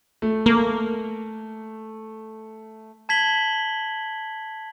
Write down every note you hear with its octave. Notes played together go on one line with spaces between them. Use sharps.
A3
A#3
A5 G#6 B6 F#7 G7